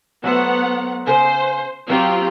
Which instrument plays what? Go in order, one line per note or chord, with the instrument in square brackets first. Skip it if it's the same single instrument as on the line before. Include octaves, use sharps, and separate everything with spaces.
[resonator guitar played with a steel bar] F#3 A3 C5 [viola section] B3 F#5
[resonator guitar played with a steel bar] C#3 [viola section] C5
[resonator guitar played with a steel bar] F#3 [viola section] C4 F4 G4